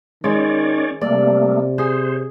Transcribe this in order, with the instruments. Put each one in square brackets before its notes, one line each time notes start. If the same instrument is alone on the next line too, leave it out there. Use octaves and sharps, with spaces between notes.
[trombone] D#3 [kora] G#3 [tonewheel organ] C#4 C#5 D5
[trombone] C3 [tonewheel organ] G3 A3 A#3 [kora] D5
[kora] G#4 [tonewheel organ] C5